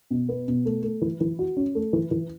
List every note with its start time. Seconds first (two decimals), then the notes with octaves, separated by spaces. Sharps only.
0.11 B2
0.29 B3
0.48 B2
0.65 A3
0.83 A3
1.02 E3
1.21 E3
1.39 F#4
1.57 C#4
1.75 A3
1.93 E3
2.11 E3